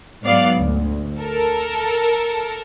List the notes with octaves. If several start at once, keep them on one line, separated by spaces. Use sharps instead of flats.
G#2 F#3 B3 D5 F5 C7
D2
A4 A#4